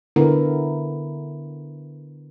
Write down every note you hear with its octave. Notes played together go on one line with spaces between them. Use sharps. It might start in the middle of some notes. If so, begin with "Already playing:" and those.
D3 B3 E4 A#4